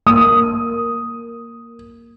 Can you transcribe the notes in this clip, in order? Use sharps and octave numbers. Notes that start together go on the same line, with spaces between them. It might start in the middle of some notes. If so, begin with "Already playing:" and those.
A#3 D#6